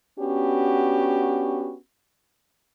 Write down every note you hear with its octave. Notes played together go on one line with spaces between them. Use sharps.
B3 C#4 D4 F#4 G4